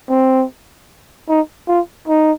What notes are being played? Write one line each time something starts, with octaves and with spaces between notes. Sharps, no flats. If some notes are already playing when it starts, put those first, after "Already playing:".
C4
D#4
F4
D#4